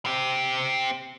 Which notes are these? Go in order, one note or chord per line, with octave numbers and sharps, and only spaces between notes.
C4 G4